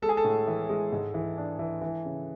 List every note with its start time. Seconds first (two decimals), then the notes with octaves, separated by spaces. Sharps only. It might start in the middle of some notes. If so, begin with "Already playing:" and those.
0.02 G#3 A4
0.09 G#4
0.17 A4
0.24 A2
0.47 E3
0.69 G#3
0.92 G#2
1.14 E3
1.38 D4
1.59 E3
1.81 E3
2.05 C#3